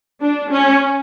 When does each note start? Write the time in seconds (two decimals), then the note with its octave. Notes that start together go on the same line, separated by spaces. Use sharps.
0.21 D4
0.51 C#4